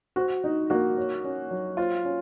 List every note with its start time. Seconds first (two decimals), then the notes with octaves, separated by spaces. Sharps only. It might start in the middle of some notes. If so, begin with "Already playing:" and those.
0.16 F#4 C5
0.44 D#4
0.70 A#3 F#4
0.98 C#5
1.24 C#4
1.51 F#3
1.77 F4 C5
2.05 C#4